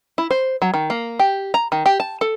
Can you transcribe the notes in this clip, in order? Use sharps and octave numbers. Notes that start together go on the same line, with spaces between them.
E4
C5
F#3
D#3
A#3
G4
A#5
D#3
G4
A5
A4